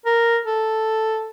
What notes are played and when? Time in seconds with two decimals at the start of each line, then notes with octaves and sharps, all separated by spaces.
0.06 A#4
0.46 A4